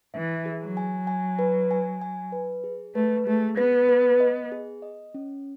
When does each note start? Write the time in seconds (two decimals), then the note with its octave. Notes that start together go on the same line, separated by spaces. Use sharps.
0.14 E3 E5
0.46 G#4
0.61 F#3
0.77 G#5
1.07 G#5
1.39 B4
1.71 G#5
2.02 G#5
2.32 B4
2.64 G#4
2.95 A3 B4
3.27 A3 G#4
3.57 B3 B4
3.89 B4
4.20 D#5
4.52 G#4
4.82 D#5
5.14 C#4